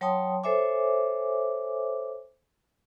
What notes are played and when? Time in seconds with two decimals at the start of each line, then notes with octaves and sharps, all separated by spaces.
0.01 F#3 C#5 G5 A5 C6 D#6
0.44 A4 C5 C#5 E5 G#5 D6